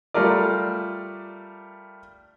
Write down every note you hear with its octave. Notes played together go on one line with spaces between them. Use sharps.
G3 A3 F4 A#4 D5